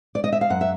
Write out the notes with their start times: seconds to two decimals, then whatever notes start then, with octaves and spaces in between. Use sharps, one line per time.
0.15 D5
0.24 D#5
0.32 E5
0.41 F5
0.50 F#2 F#5
0.61 E5